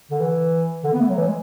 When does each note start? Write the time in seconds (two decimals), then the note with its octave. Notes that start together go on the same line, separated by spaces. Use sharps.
0.11 D3
0.21 E3
0.84 D3
0.93 B3
1.00 A3
1.09 F#3
1.17 E3
1.28 G#3